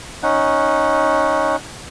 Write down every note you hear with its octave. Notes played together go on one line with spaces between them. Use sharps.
C#4 D#4 F#5